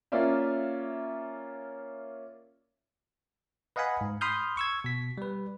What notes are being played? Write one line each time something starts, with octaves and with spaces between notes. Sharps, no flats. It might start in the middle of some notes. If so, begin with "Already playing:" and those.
A#3 C#4 F4 D5 E5
B4 D#5 F5 F#5 G#5 B5
G#2
B5 C6 D#6 F6 G6
C#6 E6 G#6
B2 B6
G3 B4